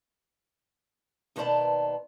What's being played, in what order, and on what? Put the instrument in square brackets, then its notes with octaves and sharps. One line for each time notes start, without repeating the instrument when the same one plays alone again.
[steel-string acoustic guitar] D#2 B2 B3 C5 D5 A5